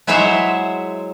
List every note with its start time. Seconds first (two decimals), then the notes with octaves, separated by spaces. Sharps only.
0.07 F#3 G#3 E4 C5 C#5 E5